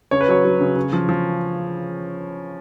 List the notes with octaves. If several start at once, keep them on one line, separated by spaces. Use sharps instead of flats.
C#3 C#5
B4
F#3 C#5
F#3
C#3
C#3
F3
F3